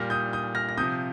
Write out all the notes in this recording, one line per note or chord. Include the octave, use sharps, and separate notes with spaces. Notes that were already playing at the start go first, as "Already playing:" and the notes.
Already playing: A#2 G3 F6 A#6
D#6 G6
D#6 G6
F6 A#6
A#6
C3 F3 D#6 G6